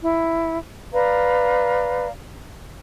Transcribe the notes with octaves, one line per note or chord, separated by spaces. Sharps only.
E4
B4 D5 F5 A#5